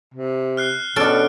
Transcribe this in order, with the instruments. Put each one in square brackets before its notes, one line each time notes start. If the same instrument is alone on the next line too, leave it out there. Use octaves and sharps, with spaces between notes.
[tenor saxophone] C3
[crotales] F6 F#6 C7
[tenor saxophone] B2 [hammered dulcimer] C#4 D4 [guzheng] A4 [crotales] F6 D7